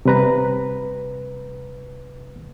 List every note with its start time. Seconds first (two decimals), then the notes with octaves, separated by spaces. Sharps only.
0.05 C3 G3 B4 A#5